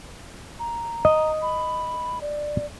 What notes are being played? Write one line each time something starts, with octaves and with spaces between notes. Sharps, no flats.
A#5
D#5
B5
D5